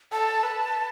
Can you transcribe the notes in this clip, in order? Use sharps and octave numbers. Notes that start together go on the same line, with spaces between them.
A4 A5
B4